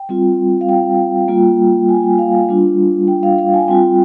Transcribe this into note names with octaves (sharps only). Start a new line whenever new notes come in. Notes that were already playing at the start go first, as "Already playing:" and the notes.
Already playing: G5
G3 C4 F4
F5
G5
G3 A#3 F4
G#5
G5
F5
G3 D4 F4
G5
F5
F5
G#5
G3 C4 F4 G5